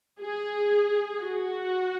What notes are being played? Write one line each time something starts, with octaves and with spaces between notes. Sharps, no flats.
G#4
F#4